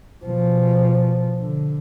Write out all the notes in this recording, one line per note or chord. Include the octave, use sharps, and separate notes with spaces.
B2 F3
D3